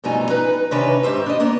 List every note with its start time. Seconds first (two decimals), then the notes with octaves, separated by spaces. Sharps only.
0.04 G2 B2 F3 A3 D#4 G#5
0.30 D#4 B4
0.71 C3 D#3 C#4 D4 B4
1.03 G#2 G4 C5 E5
1.26 D4 D#5
1.40 A#3 B3 D4 C#5